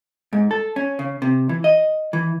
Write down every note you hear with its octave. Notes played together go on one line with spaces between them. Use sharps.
G#2
A4
C#4
C#3
C3
E3
D#5
E3